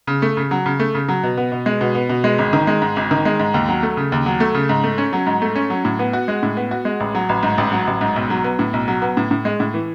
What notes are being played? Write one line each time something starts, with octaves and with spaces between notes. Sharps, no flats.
C#3
A3
C#3
F#3
C#3
A3
C#3
F#3
B2
B3
B2
G#3
B2
B3
B2
G#3
G#1
D#3
G#3
G#2
G#1
D#3
G#3
G#2
D#2
F#3
A3
C#3
D#2
F#3
A3
C#3
G#2
A3
C#4
F#3
G#2
A3
C#4
F#3
A2
B3
F#4
G#3
A2
B3
F#4
G#3
A1
F#3
A1
G#2
A1
F#3
A1
G#2
B1
F#3
B3
A2
B1
F#3
B3
A2
A2
G#3
A2
E3